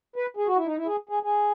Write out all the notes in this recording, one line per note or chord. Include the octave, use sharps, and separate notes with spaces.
B4
G#4
F#4
E4
D#4
E4
G#4
G#4
G#4